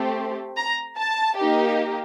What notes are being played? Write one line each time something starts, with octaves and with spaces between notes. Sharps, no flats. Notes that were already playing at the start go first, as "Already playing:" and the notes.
Already playing: A3 C4 G4
A#5
A5
A#3 D#4 G4